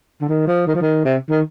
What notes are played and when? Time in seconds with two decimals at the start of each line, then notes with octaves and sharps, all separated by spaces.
0.21 D3
0.29 D#3
0.47 F3
0.67 D#3
0.75 F3
0.81 D#3
1.05 C3
1.30 D#3